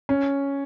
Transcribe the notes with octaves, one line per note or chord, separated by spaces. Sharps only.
C#4